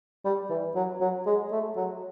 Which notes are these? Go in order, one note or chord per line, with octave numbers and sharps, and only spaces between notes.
G3
E3
F#3
F#3
G#3
A3
F#3